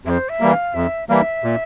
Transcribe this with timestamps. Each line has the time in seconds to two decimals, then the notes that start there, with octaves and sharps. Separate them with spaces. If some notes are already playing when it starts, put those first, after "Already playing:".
0.05 F2 E5
0.09 C5
0.29 E5
0.40 E3 G3 A#3
0.52 F5
0.74 F2 E5
1.09 E3 G3 A#3 E5 F5
1.44 A#2